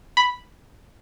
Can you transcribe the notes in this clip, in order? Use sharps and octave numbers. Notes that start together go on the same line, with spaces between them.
B5